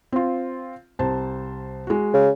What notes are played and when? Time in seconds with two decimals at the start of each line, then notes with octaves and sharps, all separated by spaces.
0.12 C4 F4
0.99 C2 C5 A5
1.87 G#3 F#4
2.14 C#3